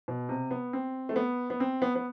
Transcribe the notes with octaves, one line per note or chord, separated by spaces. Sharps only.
B2
C3
B3
C4
A3
B3
B3
C4
B3
B3